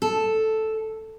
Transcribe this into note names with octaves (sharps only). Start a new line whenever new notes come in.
A4